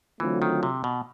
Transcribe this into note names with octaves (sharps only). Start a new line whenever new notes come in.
D3 E3 F#3 A3 C4 F4
D#3
C3
B2